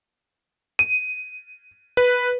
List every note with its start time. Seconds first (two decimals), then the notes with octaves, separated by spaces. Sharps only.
0.79 D#7
1.97 B4